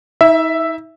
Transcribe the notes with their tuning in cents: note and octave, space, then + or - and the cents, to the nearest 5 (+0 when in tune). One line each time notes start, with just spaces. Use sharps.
D#4 +45 E5 +0